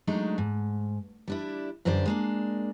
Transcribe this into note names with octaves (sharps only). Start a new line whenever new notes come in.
F#3 G#3 A3 D4 D#4
G#2
G3 D4 E4
F#2 D3 G3 C5 D5
G#3 A#3 D4